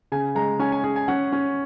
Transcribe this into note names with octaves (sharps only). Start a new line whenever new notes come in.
C#3 G#5
G#3 A#5
C#4 G#5
G#5
C#4 G#4
G#5
C#4 F#5
C#4